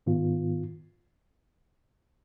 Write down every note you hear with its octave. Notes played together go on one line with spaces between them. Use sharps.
G#2 D#3 B3 F4